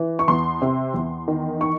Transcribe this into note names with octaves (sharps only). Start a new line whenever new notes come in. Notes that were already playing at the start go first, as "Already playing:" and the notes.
Already playing: E3
C#6
E2 C6
C3
E2
D#3
C#6